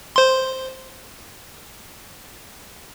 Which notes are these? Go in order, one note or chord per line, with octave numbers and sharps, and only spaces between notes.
C5 C6